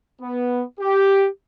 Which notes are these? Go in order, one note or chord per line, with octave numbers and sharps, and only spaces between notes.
B3
G4